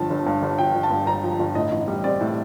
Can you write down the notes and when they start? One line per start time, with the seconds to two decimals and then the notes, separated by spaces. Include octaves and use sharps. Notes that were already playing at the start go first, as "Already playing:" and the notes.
Already playing: G1 G2 F3 A5
0.10 G1
0.26 G2
0.42 G1
0.58 F3 G5
0.75 G1
0.83 A5
0.91 G2
1.07 G1 A#5
1.23 F3
1.39 G1
1.55 A2 D#5
1.72 A1
1.88 G3
2.04 C4 D5
2.21 A2